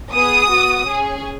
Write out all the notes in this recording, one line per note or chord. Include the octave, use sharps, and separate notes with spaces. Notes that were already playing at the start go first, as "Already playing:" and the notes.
B3 G#4 D#6
B3 F#4
C#4 G#4